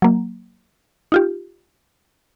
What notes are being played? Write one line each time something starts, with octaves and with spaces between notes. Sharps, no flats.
F#3 A#3
D#4 F4 G4